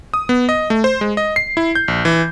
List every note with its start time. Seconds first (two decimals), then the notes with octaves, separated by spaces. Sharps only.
0.14 D#6
0.29 B3
0.49 D#5
0.70 A3
0.84 C5
1.01 G#3
1.17 D#5
1.36 C7
1.57 E4
1.75 G6
1.88 A#1
2.05 E3